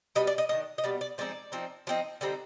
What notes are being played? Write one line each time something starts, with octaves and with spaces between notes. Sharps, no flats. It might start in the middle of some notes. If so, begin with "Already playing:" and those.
B2 G3 B3 D#5
D5
D#5
D#3 G3 D4 D#5
D#5
B2 G3 B3 D5
D5
F3 G#3 C4 D#4 D5
F3 C4 D#4
F3 C4 D#4
D3 G3 C4 D#4